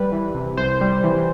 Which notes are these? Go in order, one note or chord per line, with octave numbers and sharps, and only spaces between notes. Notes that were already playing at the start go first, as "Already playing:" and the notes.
Already playing: G3 B4
E3
C3
C2 C5
G3
E3